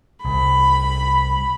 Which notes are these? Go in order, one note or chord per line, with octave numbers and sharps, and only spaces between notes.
C2 B5